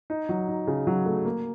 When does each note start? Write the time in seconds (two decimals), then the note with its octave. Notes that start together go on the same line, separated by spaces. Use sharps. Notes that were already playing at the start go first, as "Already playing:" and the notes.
0.10 D#4
0.29 F#3
0.48 D#4
0.68 C#3
0.87 F#3
1.06 A3
1.25 A#3